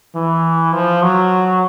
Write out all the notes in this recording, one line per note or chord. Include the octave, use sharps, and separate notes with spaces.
E3
F3
F#3